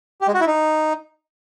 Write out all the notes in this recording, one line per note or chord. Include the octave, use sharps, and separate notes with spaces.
G4
G#3
F#4
E4
D#4